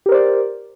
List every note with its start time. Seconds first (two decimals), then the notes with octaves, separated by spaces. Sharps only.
0.06 G4
0.09 A#4
0.12 C5
0.14 D5